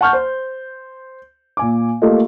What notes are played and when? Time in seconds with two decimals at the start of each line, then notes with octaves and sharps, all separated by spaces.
0.01 F#5 A5 C#6 F6 G6
0.13 C5
1.57 A#2 G#5 D6
2.02 A3 A#3 F4 G4 A4 D#5